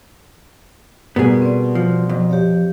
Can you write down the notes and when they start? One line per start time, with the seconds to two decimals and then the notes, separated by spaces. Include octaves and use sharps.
1.16 B2 G3 B3 G#4 A#4
1.42 C4 D5
1.75 F3
2.09 F2
2.29 G4 C#5 F5